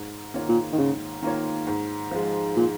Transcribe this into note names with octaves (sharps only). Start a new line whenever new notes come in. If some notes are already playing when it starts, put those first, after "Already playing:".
Already playing: G#2
D#3 A#3 F4 C#5
A#2
D#3
G#2 C#3
D#3 A#3 F4 C#5
G#2
F3 G#3
A#2